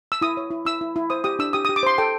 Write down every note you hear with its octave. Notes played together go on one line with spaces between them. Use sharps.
E6
E4 D#6
C#5
E4
E4 E6
E4
E4
C5 D#6
G4 D#6
D4 E6
G4 D#6
G4 D#6
D6
C5 C6
A4 G5